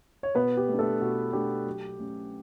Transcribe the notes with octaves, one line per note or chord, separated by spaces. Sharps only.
C#5
B2 B3 B4
G4
A3
D4
A3 A4
B2 F#4
A3 D4 G4
F#3
A3 C#4